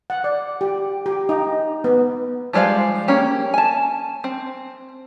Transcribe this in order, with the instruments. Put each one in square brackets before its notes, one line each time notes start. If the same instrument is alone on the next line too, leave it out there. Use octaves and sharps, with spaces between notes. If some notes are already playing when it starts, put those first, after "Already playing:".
[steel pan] F#5
D5
G4
G4
D#4
B3
[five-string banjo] F3 G3 G#3 C5 F5
A#3 C#4 G4
G#5 A5
C4